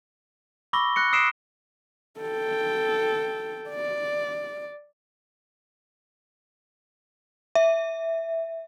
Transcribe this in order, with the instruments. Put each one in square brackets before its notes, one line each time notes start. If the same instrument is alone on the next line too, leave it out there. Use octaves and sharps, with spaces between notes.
[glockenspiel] B5 C#6 D6 E6 A#6 G7
F#6 A#6 C#7
D#6 E6 C7 D7 E7
[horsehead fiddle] A4 G5
D5
[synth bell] E5